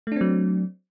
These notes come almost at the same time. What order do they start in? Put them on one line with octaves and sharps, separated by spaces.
A3 D4 C4 F#3